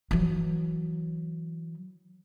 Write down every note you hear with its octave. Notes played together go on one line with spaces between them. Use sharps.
E3 F#3